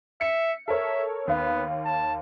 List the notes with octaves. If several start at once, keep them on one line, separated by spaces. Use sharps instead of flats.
E5 C#7
A4 A#4 C#5 E5
D#2 B3 F5
A5